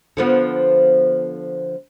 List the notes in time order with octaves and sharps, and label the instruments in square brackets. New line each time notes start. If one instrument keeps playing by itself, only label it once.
[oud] D3 F3 B3